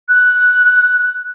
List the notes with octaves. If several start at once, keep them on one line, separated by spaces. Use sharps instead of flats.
F#6